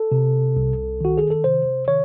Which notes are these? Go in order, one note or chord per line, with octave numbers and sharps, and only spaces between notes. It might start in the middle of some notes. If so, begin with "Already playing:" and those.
Already playing: A4
C3
C2
D#3 F#4
G#4
A4
C3 C5
D#3 C#5